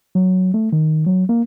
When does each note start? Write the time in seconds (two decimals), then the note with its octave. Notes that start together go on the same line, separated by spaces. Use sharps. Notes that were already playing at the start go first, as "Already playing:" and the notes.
0.15 F#3
0.54 A3
0.73 D#3
1.06 F#3
1.29 A#3